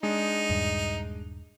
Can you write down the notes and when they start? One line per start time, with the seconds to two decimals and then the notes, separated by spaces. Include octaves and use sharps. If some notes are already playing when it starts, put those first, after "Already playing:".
0.03 G#3 D4 D#4
0.49 D#1 G2